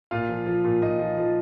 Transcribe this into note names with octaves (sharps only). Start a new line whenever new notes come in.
A#2 F4 F5
F3
F3
A#2
A#2 D#4 D#5
F3
F3